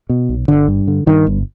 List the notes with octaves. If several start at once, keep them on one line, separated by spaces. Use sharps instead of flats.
B2
B1
G1 D3
G2
D3
G2 D#3
G1